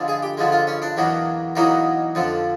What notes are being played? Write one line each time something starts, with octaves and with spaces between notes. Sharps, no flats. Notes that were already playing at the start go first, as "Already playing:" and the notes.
Already playing: G2 D3 F3 G#3
G#4
G4
G2 D3 F3 G#3
F4
C#4
D4
E2 B2 F#3 A#3
E2 B2 F#3 A#3 D#4
F2 D3 F3